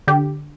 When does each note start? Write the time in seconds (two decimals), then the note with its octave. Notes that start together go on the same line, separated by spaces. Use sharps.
0.07 D3 G4